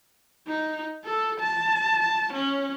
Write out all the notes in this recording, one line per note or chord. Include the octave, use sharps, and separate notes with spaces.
D#4
A4
A5
C#4